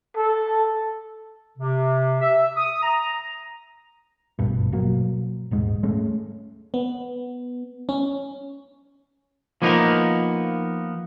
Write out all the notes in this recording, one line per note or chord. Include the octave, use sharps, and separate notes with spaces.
A4
C3
E5
D#6
A#5
G#1 G2 B2
B2 F3 F#3 A#3
D#1 G#2 G#3
G#3 A3 C#4
B3
C#4
F3 A#3 B3 D#4 A#4